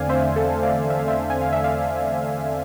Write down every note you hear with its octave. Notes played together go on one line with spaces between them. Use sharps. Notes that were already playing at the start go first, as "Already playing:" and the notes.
Already playing: E2 D3 A3 C4 D5 F5 G#5
C5 E5
A4
D5 F5
E5
F5
C5 E5
G#5
F5
E5
D5 F5